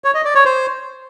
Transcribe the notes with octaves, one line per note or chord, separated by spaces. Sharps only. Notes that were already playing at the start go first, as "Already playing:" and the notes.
C#5
D#5
D5
C#5
C5